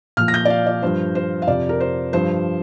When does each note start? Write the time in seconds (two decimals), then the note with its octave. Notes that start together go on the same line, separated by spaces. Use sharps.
0.17 A#2 F3 F6
0.28 A#6
0.34 G6
0.45 D5
0.50 F5
0.67 D5
0.82 G2 F3 C5
1.15 C5
1.42 F5
1.48 F2 C3 F3 D5
1.69 A#4
1.80 C5
2.13 G2 F3 C5